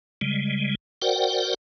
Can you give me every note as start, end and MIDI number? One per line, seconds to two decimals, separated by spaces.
0.21 0.75 49
0.21 0.75 55
0.21 0.75 56
1.02 1.54 66
1.02 1.54 70
1.02 1.54 72
1.02 1.54 74
1.02 1.54 78
1.02 1.54 79